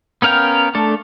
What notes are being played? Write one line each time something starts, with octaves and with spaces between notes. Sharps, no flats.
B3 C#4 A#4 F5 G5
A3 D4 A4